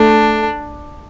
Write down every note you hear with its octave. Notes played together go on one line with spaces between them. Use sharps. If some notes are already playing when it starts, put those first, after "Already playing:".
Already playing: A3 D4